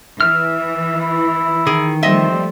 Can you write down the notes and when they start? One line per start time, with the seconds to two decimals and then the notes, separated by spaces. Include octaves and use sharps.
0.21 E3 E5 F6
1.01 E4
1.67 D#3 G#4
2.03 F3 G3 A3 C4 D#5 E5